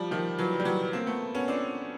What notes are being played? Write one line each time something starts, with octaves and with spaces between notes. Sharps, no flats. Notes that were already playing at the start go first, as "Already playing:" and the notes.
Already playing: F3 G3
D#3 F3
E3 F#3
G3
E3 F#3
A#3 C4
A3 B3
B3 C#4
C4 D4